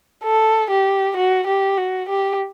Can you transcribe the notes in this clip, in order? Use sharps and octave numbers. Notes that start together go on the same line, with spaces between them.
A4
G4
F#4
G4
F#4
G4